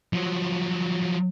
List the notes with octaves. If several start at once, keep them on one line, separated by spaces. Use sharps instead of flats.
F3 F#3